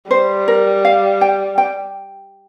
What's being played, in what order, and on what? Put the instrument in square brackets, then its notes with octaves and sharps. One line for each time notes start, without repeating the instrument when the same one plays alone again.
[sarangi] G3 [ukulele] C5
[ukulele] A#4
F5
G5
G5